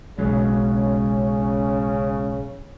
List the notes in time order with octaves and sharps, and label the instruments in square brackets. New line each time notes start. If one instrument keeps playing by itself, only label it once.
[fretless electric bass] B1 [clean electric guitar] G#2 F#3 [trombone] C#3 [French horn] C#4